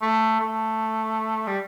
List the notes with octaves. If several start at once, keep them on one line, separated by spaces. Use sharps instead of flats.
A3
A3
G3